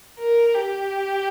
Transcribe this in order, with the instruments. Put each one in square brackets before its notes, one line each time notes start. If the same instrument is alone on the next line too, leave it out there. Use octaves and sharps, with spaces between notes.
[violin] A#4
G4